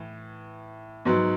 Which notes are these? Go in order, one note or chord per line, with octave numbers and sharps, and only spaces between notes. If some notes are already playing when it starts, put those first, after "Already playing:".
Already playing: A2 E3
G#2 F#3 B3